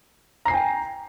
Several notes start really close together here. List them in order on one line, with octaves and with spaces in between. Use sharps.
A#5 C7 G#5 G5